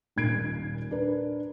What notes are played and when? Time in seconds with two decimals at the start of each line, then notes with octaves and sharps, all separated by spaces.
0.16 D#1 A#2 D#4 G#6 C7 D7
0.91 D4 A#4 B4